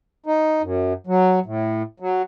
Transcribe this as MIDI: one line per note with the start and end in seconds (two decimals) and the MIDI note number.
0.26 0.62 63
0.62 0.93 42
1.07 1.39 54
1.46 1.83 45
2.00 2.22 54